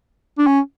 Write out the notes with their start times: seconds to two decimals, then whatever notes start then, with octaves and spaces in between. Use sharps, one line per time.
0.38 D4
0.47 C#4